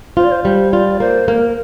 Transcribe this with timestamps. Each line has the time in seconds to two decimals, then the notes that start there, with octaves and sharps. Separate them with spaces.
0.17 F4 C5
0.24 D5
0.31 C5
0.44 G3 C5
0.73 F4 D5
1.00 A#3 C5
1.28 A#3 A#4